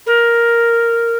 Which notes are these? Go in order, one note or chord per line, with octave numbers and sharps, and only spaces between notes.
A#4